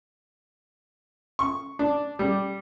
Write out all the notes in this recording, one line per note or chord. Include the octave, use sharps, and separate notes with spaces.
C#6
D4
G3